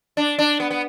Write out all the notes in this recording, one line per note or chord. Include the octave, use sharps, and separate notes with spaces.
D4
D4
B3
B3